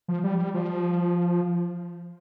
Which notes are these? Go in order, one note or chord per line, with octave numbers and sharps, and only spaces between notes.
F3
G3
G3
F3